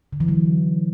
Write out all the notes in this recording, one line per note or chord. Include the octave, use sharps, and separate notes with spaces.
D3
E3
F#3